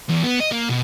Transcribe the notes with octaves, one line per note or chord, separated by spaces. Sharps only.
E2
B3
D#5
A#3
B2